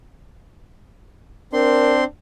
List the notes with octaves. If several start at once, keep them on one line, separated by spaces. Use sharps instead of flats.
C4 D4 A#4 C6